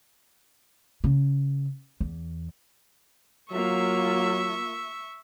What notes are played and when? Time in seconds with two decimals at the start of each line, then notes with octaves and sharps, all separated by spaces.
1.04 C#3
2.01 E2
3.52 F#3 A#3 F4 E5 C#6